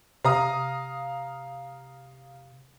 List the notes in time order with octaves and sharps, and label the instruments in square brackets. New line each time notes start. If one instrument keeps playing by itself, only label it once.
[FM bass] C3 [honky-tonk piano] F5 A#5 D#6